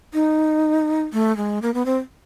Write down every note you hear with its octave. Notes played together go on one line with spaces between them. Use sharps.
D#4
A3
G#3
A#3
B3
C4